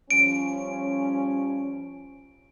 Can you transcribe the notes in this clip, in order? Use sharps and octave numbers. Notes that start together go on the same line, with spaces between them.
F3 G3 C#4 D7